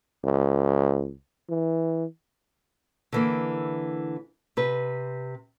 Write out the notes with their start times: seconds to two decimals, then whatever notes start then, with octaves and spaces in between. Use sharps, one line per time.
0.24 C#2
1.50 E3
3.13 D3 E3 A#3
4.57 C3 B4